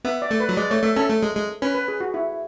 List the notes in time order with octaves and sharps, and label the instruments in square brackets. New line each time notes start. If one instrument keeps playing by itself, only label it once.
[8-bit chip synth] B3 [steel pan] E5
[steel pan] D5
[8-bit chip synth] A3
[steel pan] B4
[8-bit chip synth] F#3
[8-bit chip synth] G#3 [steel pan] D5
[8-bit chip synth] A3 [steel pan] C#5
[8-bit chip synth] A3 [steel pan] E5
[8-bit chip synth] C#4 [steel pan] A4
[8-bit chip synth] A3
G#3
G#3
[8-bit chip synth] C#4 [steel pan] B4
[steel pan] B4
G#4
F#4
E4